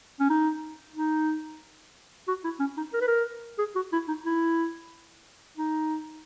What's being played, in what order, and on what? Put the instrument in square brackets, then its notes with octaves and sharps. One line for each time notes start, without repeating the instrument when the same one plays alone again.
[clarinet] C#4
D#4
D#4
F#4
E4
C#4
D#4
A#4
B4
A#4
G#4
F#4
E4
D#4
E4
D#4